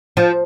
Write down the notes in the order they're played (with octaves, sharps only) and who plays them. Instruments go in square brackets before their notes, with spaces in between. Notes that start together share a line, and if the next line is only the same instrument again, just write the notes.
[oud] F3